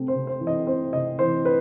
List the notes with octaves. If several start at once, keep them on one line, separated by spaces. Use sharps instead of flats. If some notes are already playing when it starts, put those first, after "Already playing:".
Already playing: C3 A3 C4
C5
C3
C5
E3
D#5
C4 C5
C3 D#5
E3 C5
B4